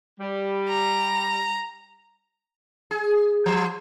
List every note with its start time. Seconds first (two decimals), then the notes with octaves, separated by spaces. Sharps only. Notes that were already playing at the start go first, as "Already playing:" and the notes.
0.20 G3
0.69 A#5
2.91 G#4
3.46 F3 C5